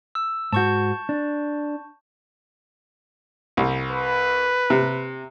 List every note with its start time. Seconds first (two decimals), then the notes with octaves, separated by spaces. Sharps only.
0.15 E6
0.53 G#2 F#4 A5 C#6 G6
1.09 D4
3.57 C2
3.91 B4
4.70 C3